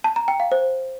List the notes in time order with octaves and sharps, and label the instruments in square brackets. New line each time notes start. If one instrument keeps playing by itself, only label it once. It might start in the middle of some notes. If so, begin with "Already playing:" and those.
[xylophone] A5
A#5
G5
F5
C5